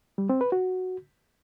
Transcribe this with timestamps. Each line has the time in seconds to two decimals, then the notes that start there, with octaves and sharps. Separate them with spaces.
0.18 G3
0.29 C4
0.41 B4
0.52 F#4